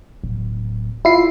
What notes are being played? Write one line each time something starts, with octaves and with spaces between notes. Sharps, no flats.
D1
E4 F4 C7